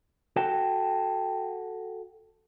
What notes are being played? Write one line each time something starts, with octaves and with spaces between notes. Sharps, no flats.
F#4 A4 G5